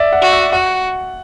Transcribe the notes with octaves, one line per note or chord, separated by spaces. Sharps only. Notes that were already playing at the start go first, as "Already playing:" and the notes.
Already playing: D5 E5
F#5
F#4
E5
F#4 F#5